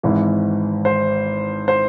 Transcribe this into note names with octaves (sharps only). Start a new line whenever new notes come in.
G#1 G#2 E3
C5
C5